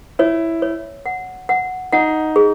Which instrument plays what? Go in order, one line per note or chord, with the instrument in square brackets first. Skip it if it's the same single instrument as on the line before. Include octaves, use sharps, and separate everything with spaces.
[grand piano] E4 [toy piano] C#5
[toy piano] C#5
F#5
F#5
[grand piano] D#4 [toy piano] F#5
[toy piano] G#4